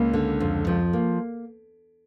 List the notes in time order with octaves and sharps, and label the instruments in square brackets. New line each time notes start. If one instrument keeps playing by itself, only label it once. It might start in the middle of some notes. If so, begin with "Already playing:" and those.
Already playing: [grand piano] C#2 C#3 [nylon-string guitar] A#3
[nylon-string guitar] D3
F2
F3
A#3